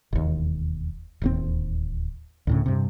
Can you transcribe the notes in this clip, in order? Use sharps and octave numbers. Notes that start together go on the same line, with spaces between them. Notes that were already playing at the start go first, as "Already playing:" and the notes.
E1 D#2
D1 D#2 C4
D2 A2 C#3
G2 C3